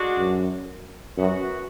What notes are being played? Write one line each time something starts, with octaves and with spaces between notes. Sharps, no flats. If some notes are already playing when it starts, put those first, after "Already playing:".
Already playing: D3 G#3 D4 F#4
F#2
F#2 E3 B3 F#4